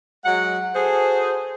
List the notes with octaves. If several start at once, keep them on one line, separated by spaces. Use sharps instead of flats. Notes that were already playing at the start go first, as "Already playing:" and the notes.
F#3 G#3 F#5
F#4 G#4 A4 C5